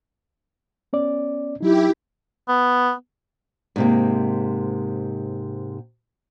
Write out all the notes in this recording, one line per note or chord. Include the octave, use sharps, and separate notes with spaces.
B3 C#4 D5
F#3 D#4 E4 G4
B3
G#2 C3 A#3